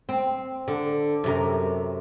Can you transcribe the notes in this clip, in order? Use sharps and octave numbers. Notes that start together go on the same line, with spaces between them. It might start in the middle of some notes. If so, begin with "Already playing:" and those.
C4
D3
F#2 C3 A#4